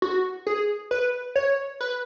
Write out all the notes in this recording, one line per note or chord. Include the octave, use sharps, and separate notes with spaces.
F#4
G#4
B4
C#5
B4